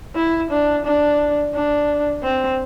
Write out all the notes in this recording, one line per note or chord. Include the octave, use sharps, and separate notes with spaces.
E4
D4
D4
D4
C4